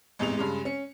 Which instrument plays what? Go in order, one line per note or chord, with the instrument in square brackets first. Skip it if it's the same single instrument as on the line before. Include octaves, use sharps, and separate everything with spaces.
[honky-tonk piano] A1 E2 G#2 C3 G#3 F7
G2 C#3 G#3
C#4 C#7